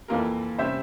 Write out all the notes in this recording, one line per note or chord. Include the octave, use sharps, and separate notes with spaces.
F2 E3 A#3 F4 A#4
C3 G3 C#4 C5 E5